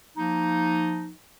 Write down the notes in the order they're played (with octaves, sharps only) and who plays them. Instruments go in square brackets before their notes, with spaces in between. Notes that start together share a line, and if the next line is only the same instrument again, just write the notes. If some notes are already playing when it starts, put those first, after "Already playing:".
[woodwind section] F3 A#3 D#4